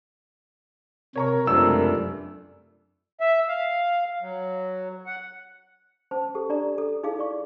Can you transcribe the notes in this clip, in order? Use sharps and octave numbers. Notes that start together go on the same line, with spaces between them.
C3 A#4 C#5 A#5 C#6
C#2 F#2 C3 A3 D4 A#4 E6
E5
F5
F#3
F#5
C#4 C5 A5
G4 A4
D4 D5 A#5
A4
D#4 E4 G#4 F5
D5 C#6